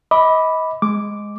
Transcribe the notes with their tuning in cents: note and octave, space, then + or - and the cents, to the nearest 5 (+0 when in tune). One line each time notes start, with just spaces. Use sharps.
D#5 +35 B5 +0 D6 +0
G#3 -5 D6 -5